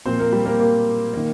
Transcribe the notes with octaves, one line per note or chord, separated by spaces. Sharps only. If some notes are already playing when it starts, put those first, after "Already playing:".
A#2 F3 A#3 C4 C5
A#3 A#4
G3 G4
A#3 A#4
A#3 A#4
D#3 A#3